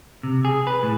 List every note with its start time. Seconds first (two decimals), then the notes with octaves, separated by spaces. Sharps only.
0.23 C3
0.45 G#4
0.67 B4
0.83 A2